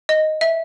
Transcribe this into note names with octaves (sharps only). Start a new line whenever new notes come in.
D#5
E5